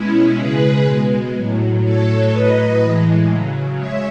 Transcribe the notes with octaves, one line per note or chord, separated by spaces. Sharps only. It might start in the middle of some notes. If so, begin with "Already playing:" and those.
Already playing: B2 G#3 C#4 E4
C#3 G#3 G#4 B4
B2 G#3
A2 F#3
A2 F#3 A4 C#5
A2 F#3 B4 D#5
A2 E3 G#3
C#3 F#3
G#3 C#5 E5